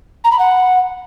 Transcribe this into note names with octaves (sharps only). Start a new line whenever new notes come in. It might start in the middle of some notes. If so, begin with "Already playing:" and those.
A#5
B5
F#5